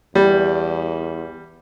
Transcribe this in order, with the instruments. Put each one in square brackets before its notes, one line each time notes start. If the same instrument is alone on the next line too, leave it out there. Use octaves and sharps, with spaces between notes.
[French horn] E2 [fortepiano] G3